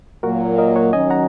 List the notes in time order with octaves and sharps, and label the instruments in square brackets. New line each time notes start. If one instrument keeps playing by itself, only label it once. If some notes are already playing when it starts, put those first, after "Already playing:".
[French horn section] A#2 F#3 A#3 [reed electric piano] F#4 A#4
[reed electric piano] A#4 D#5
C#5 F#5
[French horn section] D#3 F#3 C#4 [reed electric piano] D#5 G#5
[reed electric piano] F#5 A#5